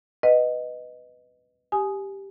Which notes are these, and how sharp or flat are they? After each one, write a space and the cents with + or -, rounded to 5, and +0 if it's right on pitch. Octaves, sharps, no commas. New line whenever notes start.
B4 +5 D#5 +0 F#5 +0
G4 +0 G#5 +15 D#6 +0